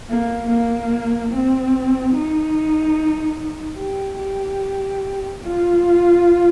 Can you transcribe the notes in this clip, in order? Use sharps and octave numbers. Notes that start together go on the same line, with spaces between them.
A#3
A#3
C4
D#4
G4
G4
F4